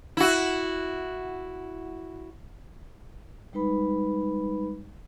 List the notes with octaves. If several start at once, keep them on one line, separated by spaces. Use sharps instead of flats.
E4 F#4
G3 G#3 D#4 B4 B5